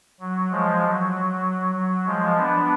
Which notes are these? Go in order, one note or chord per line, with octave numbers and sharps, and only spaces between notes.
F#3
F3 G#3
F#3
F#3
F3 G#3
B3 D4